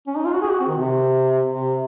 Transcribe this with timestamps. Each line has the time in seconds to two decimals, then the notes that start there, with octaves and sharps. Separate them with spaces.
0.07 C#4
0.16 D#4
0.25 F4
0.34 F#4
0.42 G#4
0.50 F#4
0.60 C4
0.68 D#3
0.78 C3
1.46 C3